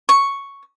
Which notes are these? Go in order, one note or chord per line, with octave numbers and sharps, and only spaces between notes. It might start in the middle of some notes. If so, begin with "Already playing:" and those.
C#6